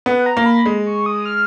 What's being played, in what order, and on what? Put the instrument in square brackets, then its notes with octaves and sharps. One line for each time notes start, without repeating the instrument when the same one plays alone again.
[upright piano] B3 [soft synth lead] F#5
[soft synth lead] A#5
[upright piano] A#3
[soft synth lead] B5
[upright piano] G#3
[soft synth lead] C#6
D#6
F6